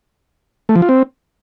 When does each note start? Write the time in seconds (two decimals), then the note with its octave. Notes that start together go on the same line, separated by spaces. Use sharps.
0.69 A3
0.76 F3
0.82 F4
0.89 C4